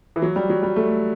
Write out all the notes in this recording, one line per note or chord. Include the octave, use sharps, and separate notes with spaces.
E3
F#3
G3
F#3
G3
A3